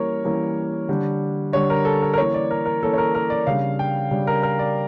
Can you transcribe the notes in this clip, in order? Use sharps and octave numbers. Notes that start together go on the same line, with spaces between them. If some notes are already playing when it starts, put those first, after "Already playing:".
Already playing: E3 G3 A#3 C#4 A#4 C#5
E3 G3 A#3 C#4
D3 G3 D4
D3 G3 D4 C#5
A#4
A4
A#4
A#4
E3 A#3 C#4 C#5
D5
A#4
A#4
E3 A#3 C#4 A4
C#5
A#4
A#4
D5
C#3 G3 D4 F5
G5
C#3 G3 D4
A#4
A#4
D5